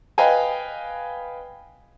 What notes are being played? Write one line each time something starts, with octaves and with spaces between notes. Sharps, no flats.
B4 D#5 F5 G5 G#5